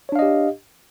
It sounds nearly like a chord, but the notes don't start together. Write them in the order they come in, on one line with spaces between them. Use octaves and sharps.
C#5 D4 F5 D#5 G4